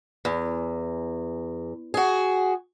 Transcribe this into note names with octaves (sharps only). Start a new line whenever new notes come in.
E2
F#4 G#4